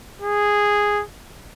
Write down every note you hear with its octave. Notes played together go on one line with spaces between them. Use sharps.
G#4